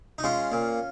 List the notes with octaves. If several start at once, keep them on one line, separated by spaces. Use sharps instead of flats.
D#4
G#3 C#4 F4
A#2